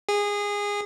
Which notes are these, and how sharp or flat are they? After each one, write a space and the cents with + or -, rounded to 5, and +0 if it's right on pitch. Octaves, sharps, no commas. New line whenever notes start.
G#4 -20